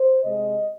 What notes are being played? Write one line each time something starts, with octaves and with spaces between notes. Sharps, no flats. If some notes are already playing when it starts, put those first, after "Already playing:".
Already playing: C5
C3 G#3 D#5